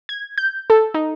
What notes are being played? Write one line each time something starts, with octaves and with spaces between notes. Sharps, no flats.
G#6
G6
A4
D#4